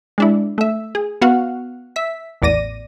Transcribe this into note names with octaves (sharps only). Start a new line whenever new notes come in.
G#3 D4 E4
A3 E5
G#4
B3 F#4 F5 F#5
E5 B6
A1 E2 D5 A#6 D#7